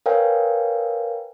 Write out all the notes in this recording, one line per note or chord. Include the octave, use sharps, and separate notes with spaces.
A#4 B4 C#5 F5 G5 G#5